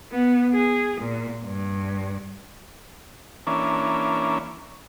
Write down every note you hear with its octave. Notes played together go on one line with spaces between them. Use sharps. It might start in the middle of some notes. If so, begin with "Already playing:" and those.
B3
G#4
A#2
G2
E3 A#3 C#4 D4